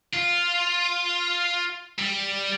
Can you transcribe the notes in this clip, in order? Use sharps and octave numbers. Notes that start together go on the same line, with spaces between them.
F4
G3